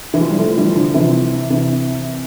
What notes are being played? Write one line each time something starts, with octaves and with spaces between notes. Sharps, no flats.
E3
F3
G3
F3 A3
E3 G3
D3 F3
C3 E3
C3 E3